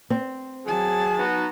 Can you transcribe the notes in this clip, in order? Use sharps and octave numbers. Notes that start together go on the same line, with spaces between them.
C4
F#3 G#4 A5
B3 D#4 F#4